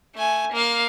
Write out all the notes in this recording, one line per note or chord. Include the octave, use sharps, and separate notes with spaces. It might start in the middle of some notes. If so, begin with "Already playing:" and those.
A3 G#5
A#3 F5